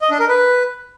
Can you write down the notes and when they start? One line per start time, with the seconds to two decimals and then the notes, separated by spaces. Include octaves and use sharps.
0.02 D#5
0.11 D4
0.20 A#4
0.29 B4